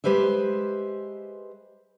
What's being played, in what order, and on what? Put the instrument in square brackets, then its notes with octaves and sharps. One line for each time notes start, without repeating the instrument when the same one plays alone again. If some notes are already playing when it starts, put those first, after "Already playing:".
[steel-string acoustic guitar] G#3 G4 B4 C5 E5